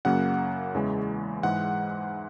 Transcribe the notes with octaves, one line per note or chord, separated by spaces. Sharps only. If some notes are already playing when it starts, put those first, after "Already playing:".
F#2 C#3 F#3 A#3 F#5
E2 C#3 E3 G#3
G#2 E3 G#3 F#5